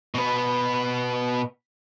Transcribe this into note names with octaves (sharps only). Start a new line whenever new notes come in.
B2 B3